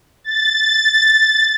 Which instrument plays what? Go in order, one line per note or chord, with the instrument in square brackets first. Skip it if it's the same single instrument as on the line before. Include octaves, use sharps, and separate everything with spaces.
[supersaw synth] A6